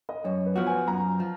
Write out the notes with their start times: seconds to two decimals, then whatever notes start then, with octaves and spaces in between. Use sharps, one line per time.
0.09 D#5
0.24 F#2 C#5
0.46 B4
0.56 F3 B3 F#4
0.67 G#5
0.87 F#2 A#5
1.20 F3